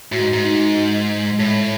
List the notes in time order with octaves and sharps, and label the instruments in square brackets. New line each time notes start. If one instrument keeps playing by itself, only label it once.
[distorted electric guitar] A2 [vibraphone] F#4
[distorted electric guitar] G#2
G#2
[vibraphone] D#4
G#3
G#3
[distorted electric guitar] A2 [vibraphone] C#5